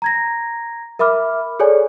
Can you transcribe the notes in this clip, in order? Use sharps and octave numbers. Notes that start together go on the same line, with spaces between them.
A#5 G#6 A#6
A#4 E5 B5 D6 F6
G#4 A4 C#5 D5 G#5